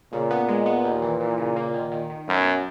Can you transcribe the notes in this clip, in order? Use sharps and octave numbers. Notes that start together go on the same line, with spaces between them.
A#2 C#3
B3
G#3
B3
D#2
E3
E3
C#3
A#3
D#3
D#3
D#3
F#2 B2